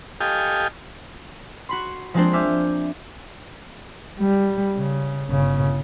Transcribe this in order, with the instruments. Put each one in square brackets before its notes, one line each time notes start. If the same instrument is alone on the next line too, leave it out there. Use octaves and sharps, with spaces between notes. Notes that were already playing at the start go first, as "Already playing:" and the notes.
[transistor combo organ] G4 A4 D#5 F5 G5 G#5
[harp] F#4 B5 C6
F3 G#3 A#3 C4 D4 C5
E5 G#5 D6 F6 G6
[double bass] G3
C#3
G1 C#3